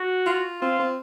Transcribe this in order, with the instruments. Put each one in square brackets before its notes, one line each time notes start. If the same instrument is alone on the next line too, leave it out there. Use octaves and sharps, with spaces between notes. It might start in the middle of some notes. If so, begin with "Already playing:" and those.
Already playing: [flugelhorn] F#4
[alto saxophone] F4
[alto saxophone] C4 [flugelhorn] F4
[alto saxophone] C4